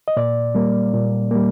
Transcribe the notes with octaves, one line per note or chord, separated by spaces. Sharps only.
D#5
A#2 D5
G3 A#3
A#2
G3 A#3